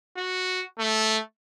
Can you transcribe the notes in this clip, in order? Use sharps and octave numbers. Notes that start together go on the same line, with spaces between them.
F#4
A3